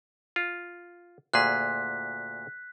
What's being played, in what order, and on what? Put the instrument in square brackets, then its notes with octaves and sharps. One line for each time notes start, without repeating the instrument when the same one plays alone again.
[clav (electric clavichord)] F4
[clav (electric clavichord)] D2 A#2 G#4 [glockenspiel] F#6 B6